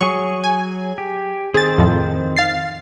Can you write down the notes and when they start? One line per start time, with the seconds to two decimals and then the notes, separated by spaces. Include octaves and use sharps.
0.01 F#3 G#4 C#6
0.44 G#5
0.98 G4
1.54 D#3 C4 G#4 C5 A6
1.78 F2 A2 F3
2.36 F5 A6 C7